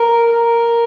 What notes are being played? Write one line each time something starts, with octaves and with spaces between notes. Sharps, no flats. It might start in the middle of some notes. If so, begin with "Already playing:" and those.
Already playing: A#4
A#4